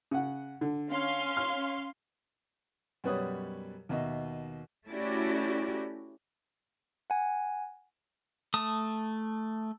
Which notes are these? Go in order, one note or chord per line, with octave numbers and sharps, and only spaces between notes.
C#3 F#5
D3
C#4 F5 C6
F6
F#2 B2 G3 B4 C#5 D#6
D#2 B2 D#5 E5
A3 C#4 E4 F#4 G4 D5
F#5 G#5
A3 A5 D#6